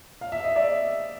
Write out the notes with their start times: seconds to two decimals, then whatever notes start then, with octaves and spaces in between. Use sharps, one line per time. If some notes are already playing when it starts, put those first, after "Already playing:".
0.21 F5
0.32 E5
0.44 D#5
0.56 D5 E5